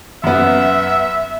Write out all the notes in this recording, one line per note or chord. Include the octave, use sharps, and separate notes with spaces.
F#2 B3 E5